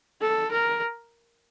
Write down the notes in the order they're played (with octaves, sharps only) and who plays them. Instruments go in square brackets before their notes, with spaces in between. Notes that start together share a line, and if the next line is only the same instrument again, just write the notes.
[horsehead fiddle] A4
A#4